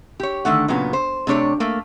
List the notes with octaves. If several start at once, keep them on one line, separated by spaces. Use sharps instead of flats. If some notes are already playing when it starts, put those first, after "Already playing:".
G4 C#5
D3 D#3 A3 F#5
A#2 C#3 F#3 B3
C5
C3 A3 D4 C#5 D5
A3 A#3